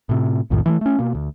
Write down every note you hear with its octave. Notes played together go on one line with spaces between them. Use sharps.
A2 C3
B1 F2 A2 D#3
E3 F3 A3
A3 C#4
B2 A#3
D2